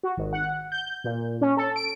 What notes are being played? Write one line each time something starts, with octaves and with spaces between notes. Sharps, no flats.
F#4
G#1
F#5
G6
A#2
C#4
A4
D7